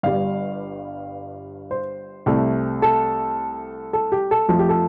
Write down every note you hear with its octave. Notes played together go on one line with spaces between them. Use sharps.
G1 G2 G3 F5
C5
C2 C3 A3
A4
A4
G4
A4
F2 F3 A3 A4
G4
A4